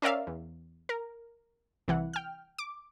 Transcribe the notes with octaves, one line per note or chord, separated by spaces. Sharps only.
C#4 A#4 D5 E5 F5
E2
A#4
C2 E3 F#5
G5 F6
D6